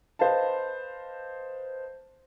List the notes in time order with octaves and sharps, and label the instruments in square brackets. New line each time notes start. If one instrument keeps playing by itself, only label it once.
[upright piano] B4 C5 D#5 F5 A5